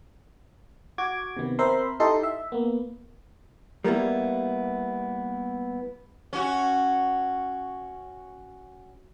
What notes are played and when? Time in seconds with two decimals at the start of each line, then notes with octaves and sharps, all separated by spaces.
0.98 F#4 D6 G#6
1.37 C3 D#3 B3
1.59 C4 A#4 C5 E5 B5 C6
2.00 D#4 E4 G4 A4 D#5 C6
2.23 E5
2.52 A#3 B3
3.84 G3 A#3 B3 E4
6.33 C#4 F#4